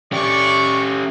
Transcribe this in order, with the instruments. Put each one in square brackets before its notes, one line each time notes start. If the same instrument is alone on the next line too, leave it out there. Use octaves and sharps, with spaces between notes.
[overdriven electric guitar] C#4 G4 [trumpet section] D5 C#6